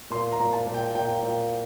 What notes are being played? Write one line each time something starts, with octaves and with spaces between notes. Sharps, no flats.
A#2 C6
A#5
A#2
A5
A#2
G5
A#2 G5
A#2